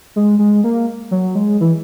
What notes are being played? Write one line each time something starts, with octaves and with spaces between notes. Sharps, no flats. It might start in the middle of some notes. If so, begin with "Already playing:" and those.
G#3
G#3
A#3
F#3
G#3
E3